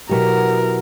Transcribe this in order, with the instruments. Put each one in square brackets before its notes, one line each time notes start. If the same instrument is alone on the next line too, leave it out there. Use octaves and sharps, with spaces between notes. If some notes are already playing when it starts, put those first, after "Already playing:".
[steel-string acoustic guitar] B2 F#3 B3 E4 G4 [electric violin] A#4